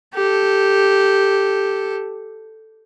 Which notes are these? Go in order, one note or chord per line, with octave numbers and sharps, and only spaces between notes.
G4 A4